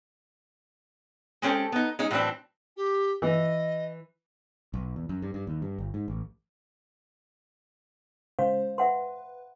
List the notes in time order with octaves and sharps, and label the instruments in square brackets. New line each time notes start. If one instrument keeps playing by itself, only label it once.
[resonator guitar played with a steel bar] G#3 C4 C#4 G4 A4
B3 D#4
G#3 C#4 D#4
A2 E3 F#3 C4 D4
[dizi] G4
[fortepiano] E3 [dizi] D#5
[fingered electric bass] B1
E2
F#2
G2
G2
D#2
G2
G1
G#2
A1
[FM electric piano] C#3 G#3 C5 [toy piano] F5
[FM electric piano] B4 [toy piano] E5 F#5 C6